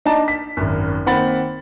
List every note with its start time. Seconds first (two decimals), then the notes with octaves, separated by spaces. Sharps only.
0.05 D4 D#4 D#5 A5 A#5
0.28 B6
0.57 G#1 F#2
1.06 D#3 A#3 C4 F#5 B5 A6